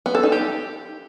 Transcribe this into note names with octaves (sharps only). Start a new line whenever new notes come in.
B3
A4
D#4
G4